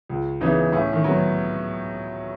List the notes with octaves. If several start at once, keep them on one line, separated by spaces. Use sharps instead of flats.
C#2
C#3 E3 B3 D#4
A2 C#4
D#3
F#3 B3